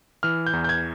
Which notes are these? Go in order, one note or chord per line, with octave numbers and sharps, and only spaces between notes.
E3 F6
G6
E2
G6
G#6